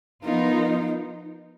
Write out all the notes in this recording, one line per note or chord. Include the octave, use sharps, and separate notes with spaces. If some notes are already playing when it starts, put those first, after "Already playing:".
F3 B3 D#4 F4 A#4